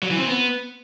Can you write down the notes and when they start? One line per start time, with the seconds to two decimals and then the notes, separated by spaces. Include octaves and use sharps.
0.03 F#3
0.10 E3
0.18 C4
0.26 B3